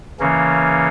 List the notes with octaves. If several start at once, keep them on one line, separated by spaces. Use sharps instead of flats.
C#3 E3 A#3 C#4